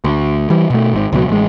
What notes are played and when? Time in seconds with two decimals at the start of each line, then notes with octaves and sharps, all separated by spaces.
0.04 D2
0.50 E3 G3
0.70 B2 A3
0.93 G#1 G#2
1.12 C#2 B2 F#3
1.29 A1 G#3